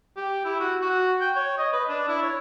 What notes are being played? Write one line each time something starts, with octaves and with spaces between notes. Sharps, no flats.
G4
E4
F#4
F#4
G5
C#5
D#5
B4
D4
E4
C#5